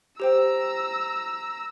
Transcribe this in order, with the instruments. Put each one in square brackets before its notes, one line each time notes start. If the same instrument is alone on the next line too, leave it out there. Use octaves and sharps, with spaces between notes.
[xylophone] G4 C5 G5 [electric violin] A#5 E6